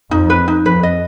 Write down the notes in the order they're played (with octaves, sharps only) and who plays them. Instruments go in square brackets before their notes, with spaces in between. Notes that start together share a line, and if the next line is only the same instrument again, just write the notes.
[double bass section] F2 [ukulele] D#4
[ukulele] B4
D#4
[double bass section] F2 [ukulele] B4
[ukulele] D#5